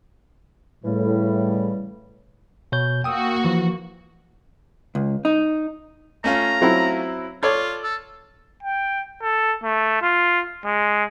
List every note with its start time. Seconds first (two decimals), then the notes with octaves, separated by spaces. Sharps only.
0.85 A2 C#3 E3 G3
2.72 B2 C#5 G6
3.04 A#3 F#4 G5 D#6 E6
3.44 E3 F3
4.95 C#2
5.25 D#4
6.24 A3 C#4 F4 A#5
6.61 F#3 C4 E4
7.43 F4 A4 C#5 D5 G#6
7.84 A4
8.63 G5
9.22 A4
9.64 A3
10.02 F4
10.65 G#3